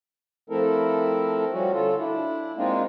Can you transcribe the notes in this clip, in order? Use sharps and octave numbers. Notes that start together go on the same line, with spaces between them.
F3 A3 C4 E4 A4 A#4
F3 G3 C#4 F#4
D3 F4 A4
D4 E4
G#3 A#3 C4 D4 D#4 F4